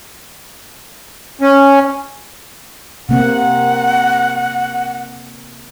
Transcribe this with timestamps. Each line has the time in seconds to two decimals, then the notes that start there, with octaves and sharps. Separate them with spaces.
1.41 C#4
3.09 C3 A#3 C4 F#5